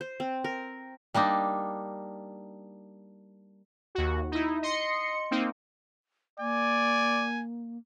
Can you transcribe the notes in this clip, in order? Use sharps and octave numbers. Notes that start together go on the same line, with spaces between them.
C5
C4
A#4
G3 A#3 D4 D#4
D#2 F#4
D#4 E4
D#5 C6 C#7
A#3 C4 D#4
A#3 D5 G#5